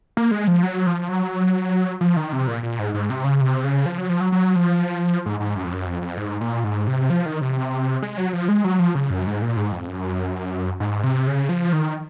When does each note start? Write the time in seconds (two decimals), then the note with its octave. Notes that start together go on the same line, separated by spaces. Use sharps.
0.17 A#3
0.31 G#3
0.47 F3
0.63 F#3
0.86 F3
1.09 F#3
2.01 F3
2.16 D#3
2.33 C3
2.47 A#2
2.63 A#2
2.79 G#2
2.94 G#2
3.10 C3
3.24 C#3
3.41 C3
3.64 C#3
3.86 F3
3.98 F#3
4.09 F3
4.21 F#3
4.32 F#3
4.56 F3
5.26 G#2
5.40 G#2
5.56 F#2
5.65 F2
5.72 F#2
5.87 F2
6.02 F2
6.17 G#2
6.41 A#2
6.64 G#2
6.87 C3
7.10 F3
7.26 D#3
7.41 C3
8.03 G#3
8.18 F#3
8.33 F3
8.48 G#3
8.64 F#3
8.79 F3
8.95 C#3
9.10 F#2
9.27 G#2
9.42 A#2
9.56 G#2
9.72 F2
9.88 F#2
10.80 G#2
11.04 C3
11.27 C#3
11.49 F3
11.73 D#3